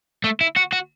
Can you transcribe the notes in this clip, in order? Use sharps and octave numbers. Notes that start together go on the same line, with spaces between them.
A3
E4
F#4
F#4